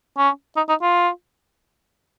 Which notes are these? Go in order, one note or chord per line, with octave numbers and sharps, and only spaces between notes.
C#4
D#4
D#4
F4